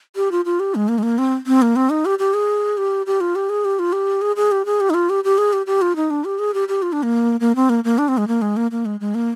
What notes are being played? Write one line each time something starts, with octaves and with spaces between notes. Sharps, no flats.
G4
F4
F4
G4
G#3
A#3
G#3
A#3
C4
C4
A#3
C4
D#4
G4
G4
G#4
G4
G4
F4
G4
G#4
G4
F4
G4
G#4
G#4
G4
G#4
G4
D#4
F4
G4
G4
G#4
G4
G4
F4
D#4
D4
G4
G#4
G4
G4
F4
D4
A#3
A#3
C4
A#3
A#3
D4
C4
G#3
A#3
G#3
A#3
A#3
G#3
G#3
A#3